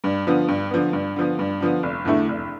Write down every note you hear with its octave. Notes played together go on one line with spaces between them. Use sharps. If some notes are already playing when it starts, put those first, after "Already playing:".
G2
D3 F3 B3
G2
D3 F3 B3
G2
D3 F3 B3
G2
D3 F3 B3
F1
E2 D3 A3 E4
F1